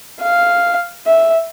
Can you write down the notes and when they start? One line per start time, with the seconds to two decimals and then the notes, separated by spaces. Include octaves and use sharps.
0.22 F5
1.07 E5